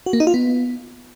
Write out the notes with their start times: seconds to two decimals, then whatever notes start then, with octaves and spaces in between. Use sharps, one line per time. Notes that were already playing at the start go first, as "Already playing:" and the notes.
0.06 F#4
0.13 A#3
0.20 D#4
0.27 F4
0.34 B3